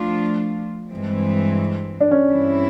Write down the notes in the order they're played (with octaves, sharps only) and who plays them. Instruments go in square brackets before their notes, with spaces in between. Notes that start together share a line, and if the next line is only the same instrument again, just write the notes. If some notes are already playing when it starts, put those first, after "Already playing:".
Already playing: [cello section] F3 A3 D4 F4
G2 E3 G#3 C4
[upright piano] D4
C#4
[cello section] G2 E3 G3 C4 E4